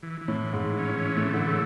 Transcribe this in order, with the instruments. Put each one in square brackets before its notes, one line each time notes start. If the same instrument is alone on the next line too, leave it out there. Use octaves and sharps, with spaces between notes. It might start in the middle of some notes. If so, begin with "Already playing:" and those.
[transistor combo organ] E3
E3
[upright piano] A2
[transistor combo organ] E3
[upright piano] G#2
[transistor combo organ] E3
C#4
E3
[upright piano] A2 [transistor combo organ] A3
[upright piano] D3 [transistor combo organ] E3
[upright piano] C#3